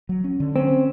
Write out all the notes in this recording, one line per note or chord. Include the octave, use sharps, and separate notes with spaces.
F#3
C#4
D3
C4 C#4